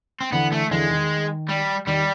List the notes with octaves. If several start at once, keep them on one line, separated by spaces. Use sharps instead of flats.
C4
D3 E3 B3
A3
D3 E3 G#3
D#3
G3
D#3 G3